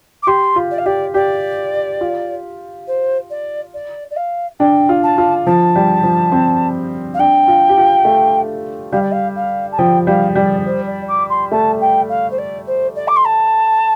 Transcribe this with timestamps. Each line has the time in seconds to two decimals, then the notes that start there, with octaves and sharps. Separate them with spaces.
0.22 D6
0.27 G4 C6
0.56 F4
0.71 D5
0.78 F5
0.86 G4 D5
1.14 G4 D5
2.01 F4
2.87 C5
3.30 D5
3.74 D5
4.10 D5
4.16 F5
4.59 D4 G5
4.89 F4
5.03 A5
5.18 F4
5.46 F3 A5
5.76 G3
6.03 F3
6.32 C4
7.14 F5
7.19 D4 G5
7.48 F4
7.69 G4
7.77 F4
8.05 A3
8.92 G3 F5
9.02 D5
9.12 F5
9.36 F5
9.72 A5
9.78 F3 G5
10.07 G3 F5
10.35 G3 D5
10.65 C5
10.86 D5
11.08 D6
11.29 C6
11.51 A3 A5
11.81 G5
12.09 F5
12.31 C5
12.38 D5
12.67 C5
12.96 D5
13.07 D6
13.16 C6
13.25 A5